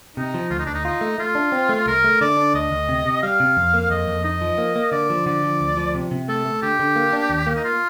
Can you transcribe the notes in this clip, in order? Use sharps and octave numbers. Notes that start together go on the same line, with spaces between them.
C3 D#4
F3
D2 F4
D#4
D2 D4
D#4
D#4 F4
A3
A3 F4
D4
C4
A3
C2 A#4
A3
D3 D5
D4
D2 D#5
D2
C3
C3
G3 F5
C3
F2
A#3
F2 D#5
F2
D#4 D#5
F3
A#3
A#3
D3 D5
F3
D3 D5
F3
D2
F3
C3
C3
A3 A4
A3
D3 G4
D3
A#3
D4
D#2
A#3
D#4
F4